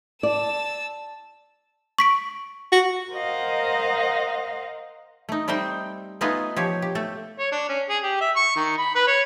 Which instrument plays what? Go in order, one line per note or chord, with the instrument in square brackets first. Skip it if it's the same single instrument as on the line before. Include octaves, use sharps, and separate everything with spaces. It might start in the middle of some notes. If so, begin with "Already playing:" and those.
[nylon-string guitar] D5 [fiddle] A5 E6
[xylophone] C#6 B6 D7
[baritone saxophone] F#4
[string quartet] A#4 C5 D#5 F5 F#5
[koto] A3 D#4
G3 A3 C4 D#4 C5 G5
A3 B3 D#4 F4 B4 G#5
F3 G4 C#5
G4
A3 A4
[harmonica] C#5
D4
C#4
G#4
G4
E5
C#6
D#3
B5
B4
C#5